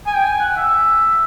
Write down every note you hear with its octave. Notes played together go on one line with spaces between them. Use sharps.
G#5
G5
G#5
F#5
E5